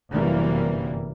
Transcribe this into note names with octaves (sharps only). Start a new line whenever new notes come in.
G1 F#2 C3 E3 G3 A#3